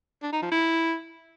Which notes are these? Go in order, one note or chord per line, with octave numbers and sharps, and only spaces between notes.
D4
D#4
F3
E4